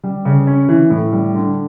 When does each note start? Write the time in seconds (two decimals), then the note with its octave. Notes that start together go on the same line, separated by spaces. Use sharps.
0.04 G3
0.25 C#3
0.47 C#4
0.69 E3
0.90 A2
1.12 G3
1.34 D3